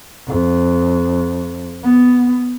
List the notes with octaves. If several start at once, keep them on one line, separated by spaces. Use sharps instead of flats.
F2
B3